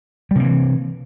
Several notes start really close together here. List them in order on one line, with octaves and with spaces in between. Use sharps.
G3 C3 A#3 E3